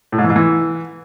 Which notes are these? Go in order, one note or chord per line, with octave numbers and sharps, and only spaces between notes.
A2
G#2
E3
G#2
E3